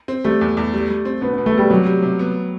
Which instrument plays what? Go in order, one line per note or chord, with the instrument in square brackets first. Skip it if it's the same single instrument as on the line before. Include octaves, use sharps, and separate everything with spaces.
[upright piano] C4
[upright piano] G3 [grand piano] A3
[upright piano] E2
E2
G3
G3
C4
[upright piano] B2 [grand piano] B3
[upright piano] B2 [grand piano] B3
[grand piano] A3
[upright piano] B2 [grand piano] G3
[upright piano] C3 [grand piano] F#3
[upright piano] G3
C3
B3